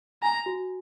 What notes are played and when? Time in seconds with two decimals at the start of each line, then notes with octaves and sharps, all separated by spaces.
0.23 G#5 A#5
0.46 F#4